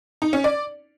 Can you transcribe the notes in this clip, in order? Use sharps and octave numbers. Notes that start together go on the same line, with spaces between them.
D#4
C#4
D5